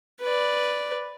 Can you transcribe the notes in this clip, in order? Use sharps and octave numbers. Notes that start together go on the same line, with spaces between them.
B4 D5